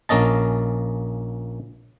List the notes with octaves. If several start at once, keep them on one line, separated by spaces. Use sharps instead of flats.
A#1 A#3 C#4 D#5 A5